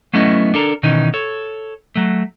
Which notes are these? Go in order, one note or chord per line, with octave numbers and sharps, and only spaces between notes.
F#3 A3 B3 C#4 E4 D#5
D4 A4 A#4
B2 D#3 E3 C#4 D#4
A4 C#5
F#3 A3